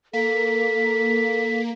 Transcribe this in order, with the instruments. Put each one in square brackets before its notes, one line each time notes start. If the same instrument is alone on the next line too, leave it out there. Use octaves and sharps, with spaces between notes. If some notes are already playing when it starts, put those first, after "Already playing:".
[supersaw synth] A#3 [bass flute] A4 [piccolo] B6